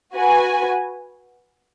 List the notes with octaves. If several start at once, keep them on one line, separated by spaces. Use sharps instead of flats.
F#4 B4 G#5